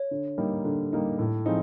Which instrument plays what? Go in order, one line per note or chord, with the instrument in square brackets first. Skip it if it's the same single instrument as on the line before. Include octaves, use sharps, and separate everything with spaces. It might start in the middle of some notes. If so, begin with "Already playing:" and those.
Already playing: [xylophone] C#5
[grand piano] D3
G3 A#3 D#4
D3
G3 A#3 D#4
A2
F3 G#3 C4 D#4